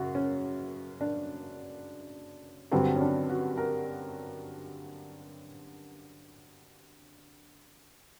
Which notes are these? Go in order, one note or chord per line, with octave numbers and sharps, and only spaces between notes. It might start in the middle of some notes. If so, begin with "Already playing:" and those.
Already playing: F#2 C#3 F#4
C#4
D4
G2 D3 F#3 C4
C#4
D4
F#4
A#4